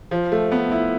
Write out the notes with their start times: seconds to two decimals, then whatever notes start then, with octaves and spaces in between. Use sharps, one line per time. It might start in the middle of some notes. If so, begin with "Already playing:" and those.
0.11 F3
0.32 A3
0.52 B3
0.72 E4